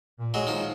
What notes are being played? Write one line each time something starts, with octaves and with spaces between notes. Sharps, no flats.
A#2
F#3 G#3
D#3 F3